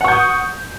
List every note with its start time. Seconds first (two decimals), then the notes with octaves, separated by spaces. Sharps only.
0.01 F#5
0.04 C#6
0.08 G6
0.12 D#6